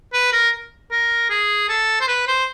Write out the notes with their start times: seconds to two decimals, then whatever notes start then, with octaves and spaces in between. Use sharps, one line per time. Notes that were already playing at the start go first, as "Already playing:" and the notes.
0.13 B4
0.32 A#4
0.91 A#4
1.30 G#4
1.69 A4
2.01 C5
2.08 B4
2.28 C5